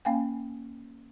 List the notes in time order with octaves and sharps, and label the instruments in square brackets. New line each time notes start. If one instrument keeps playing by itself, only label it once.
[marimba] A#3 C#4 F5 G5 G#5